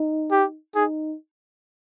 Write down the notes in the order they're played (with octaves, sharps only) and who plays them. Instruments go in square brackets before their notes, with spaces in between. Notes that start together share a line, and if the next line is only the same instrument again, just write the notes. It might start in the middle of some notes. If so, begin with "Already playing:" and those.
Already playing: [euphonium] D#4
[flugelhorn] G4
[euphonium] D#4 [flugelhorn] G#4